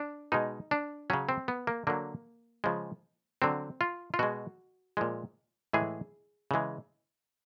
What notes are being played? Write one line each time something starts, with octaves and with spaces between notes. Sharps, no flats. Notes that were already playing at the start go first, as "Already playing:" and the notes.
Already playing: D4
B2 G#3 D#4
D4
C#3 F#3 C#4
C4
B3
A#3
D3 F#3 A#3
C#3 F3 G#3
D3 F#3 C4
F4
F4
B2 G#3 F#4
A#2 F3 G#3
A2 E3 G#3 G#4
C#3 E3 G#3